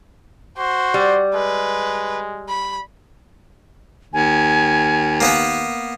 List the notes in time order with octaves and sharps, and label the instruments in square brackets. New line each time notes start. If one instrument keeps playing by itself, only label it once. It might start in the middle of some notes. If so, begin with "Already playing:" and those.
[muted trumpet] F#4 [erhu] C5
[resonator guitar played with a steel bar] G3
[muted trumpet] G#3 [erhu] B4
[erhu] B5
[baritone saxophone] D#2 [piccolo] G#5
[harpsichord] A#3 B3 B4